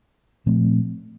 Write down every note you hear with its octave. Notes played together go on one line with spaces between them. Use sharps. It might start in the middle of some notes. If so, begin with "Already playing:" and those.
A#2 F3 A3 C4